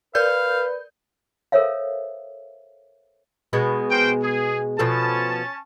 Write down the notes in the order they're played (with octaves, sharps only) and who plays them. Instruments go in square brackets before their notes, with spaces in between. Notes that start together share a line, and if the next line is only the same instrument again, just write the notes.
[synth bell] A#4 D5 G6 [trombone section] B4 [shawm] F5
[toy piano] A4 A#4 C5 C#5 E5 F5
[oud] B2 G#3 B3
[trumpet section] A#4 C5 G5
G#4
[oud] B2 F3 A4 [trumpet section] C#4 A5